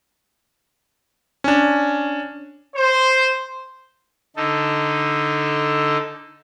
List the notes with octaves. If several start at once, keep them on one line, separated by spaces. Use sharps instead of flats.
C#4 D4
C5
D3 D#4 A4